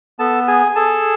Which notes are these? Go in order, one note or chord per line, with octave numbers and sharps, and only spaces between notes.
B3 A4 A5
G#4 G#5
G#4 A4 A5